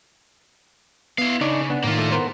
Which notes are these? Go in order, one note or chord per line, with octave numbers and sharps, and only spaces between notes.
B3 E4 F5
C#3 D4 D#4 C#5 D5
B3 D4
A2 D#3 A#3 F4
A3
B3 A#4 C5